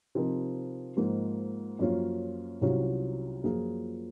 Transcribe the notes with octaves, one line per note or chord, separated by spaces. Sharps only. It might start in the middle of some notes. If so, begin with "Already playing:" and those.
C3 F3 C4 D#4 A#4
G#2 F3 A#3 D#4 A#4
F#2 F3 A#3 C#4 F4
C2 C3 F#3 C#4 F4
F#2 F3 A#3 F4 G#4